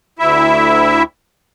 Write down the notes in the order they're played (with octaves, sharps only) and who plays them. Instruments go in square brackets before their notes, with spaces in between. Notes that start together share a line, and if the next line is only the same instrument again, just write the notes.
[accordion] D2 E4 E5